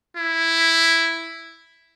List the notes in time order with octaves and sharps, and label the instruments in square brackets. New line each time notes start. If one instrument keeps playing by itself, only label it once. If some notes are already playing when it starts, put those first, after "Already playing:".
[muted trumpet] E4